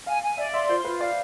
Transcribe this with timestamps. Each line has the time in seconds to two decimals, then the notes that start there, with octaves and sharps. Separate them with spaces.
0.06 F5 G#5
0.23 G#5
0.37 D5 E5
0.53 E5 C6
0.68 F4 C5
0.84 F4 B4
1.00 D5 F5